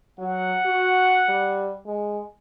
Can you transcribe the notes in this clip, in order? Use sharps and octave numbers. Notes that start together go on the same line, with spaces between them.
F#3 F#5
F#4
G3
G#3